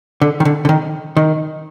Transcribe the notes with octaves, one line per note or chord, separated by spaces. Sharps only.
D3
D#3
D3
D3
D#3
D#3